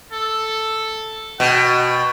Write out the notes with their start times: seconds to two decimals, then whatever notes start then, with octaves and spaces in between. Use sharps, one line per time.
0.13 A4
1.40 B2 G5